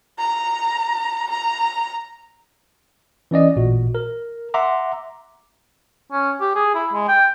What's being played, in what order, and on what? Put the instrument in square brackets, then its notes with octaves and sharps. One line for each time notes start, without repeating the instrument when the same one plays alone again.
[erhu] A#5
A#5
[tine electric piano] E3 C#4 D5 D#5
A1 A#2 F#4
A#4
E5 F#5 A#5 C6 D6
[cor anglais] C#4
G4
G#4
E4
G#3
G5